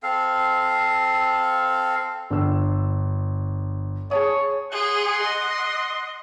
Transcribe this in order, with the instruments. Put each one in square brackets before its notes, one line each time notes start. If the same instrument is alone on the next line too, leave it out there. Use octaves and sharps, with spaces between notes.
[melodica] C4 A4 F5
[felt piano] G1 D4 E6
[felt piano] G#4 A5 D#6 [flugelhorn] C#5
[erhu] G#4 [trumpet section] F#5 C6
[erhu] D#5